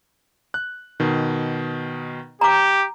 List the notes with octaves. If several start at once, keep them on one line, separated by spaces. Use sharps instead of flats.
F#6
B2 D#3
G4 A#5 D6